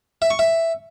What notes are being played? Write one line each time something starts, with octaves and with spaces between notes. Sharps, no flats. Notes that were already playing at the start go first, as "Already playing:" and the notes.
E5
C#6
E5